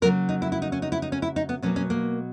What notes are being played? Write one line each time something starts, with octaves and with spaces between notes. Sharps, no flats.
C#3 F#3 A#3 A#4
D#4
E4
E4
D#4
C#4
D#4
E4
D#4
C#4
E4
D#4
B3
B2 F#3 A#3 C#4
C#4
A#3